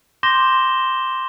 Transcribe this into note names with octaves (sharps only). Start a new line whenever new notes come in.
C6 D6 G6 A#6 E7 G7